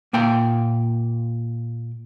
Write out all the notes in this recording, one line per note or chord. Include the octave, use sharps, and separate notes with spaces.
A#2 A#3 G5